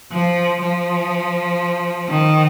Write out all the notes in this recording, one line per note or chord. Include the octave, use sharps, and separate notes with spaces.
F3
F3
D#3